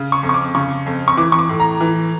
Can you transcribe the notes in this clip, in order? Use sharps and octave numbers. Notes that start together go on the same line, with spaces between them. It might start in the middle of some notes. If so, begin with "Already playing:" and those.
Already playing: C#3
C#6
F2
C#6
D6
C#3 C#6
F2
C#6
E3 D6
C#6
D6
A2
A#5
E3